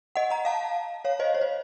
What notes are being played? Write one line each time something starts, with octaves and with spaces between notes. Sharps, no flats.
D#5 F#5
F#5 A#5
F5 A5
C#5 F5
C5 D#5
C#5
C5